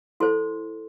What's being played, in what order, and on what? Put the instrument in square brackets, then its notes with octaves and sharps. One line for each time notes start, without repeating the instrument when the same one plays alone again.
[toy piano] E4 A4 C5 C6